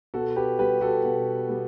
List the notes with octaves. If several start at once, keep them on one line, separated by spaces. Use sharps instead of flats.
B2 F#4 A4
G4 B4
G3 B3 G4 B4
F#4 A4
B2
G3 B3